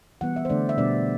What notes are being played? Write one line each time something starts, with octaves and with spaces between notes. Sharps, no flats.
E3 G3 B3 F#5
E5
C5
D3 A3 D4 D5
E5
B2 G3 B3 D4 D5